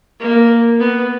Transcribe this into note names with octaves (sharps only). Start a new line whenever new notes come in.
A#3
B3